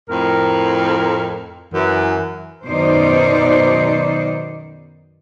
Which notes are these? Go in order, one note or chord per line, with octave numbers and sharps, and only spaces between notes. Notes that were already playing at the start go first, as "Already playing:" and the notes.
F2 A2 A#4
F#2 E3
F#2 B2 D#3 D#4 C5 D5